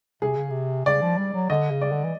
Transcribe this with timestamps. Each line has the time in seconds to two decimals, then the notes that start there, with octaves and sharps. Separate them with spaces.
0.22 C3 G#4
0.36 C#3
0.50 C3
0.86 C#3 D5
1.02 F3
1.18 G3
1.34 F#3
1.50 D3 D#5
1.71 C#3
1.81 D5
1.92 D3
2.04 E3